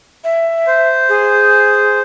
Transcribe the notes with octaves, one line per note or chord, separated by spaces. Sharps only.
E5
C5
G#4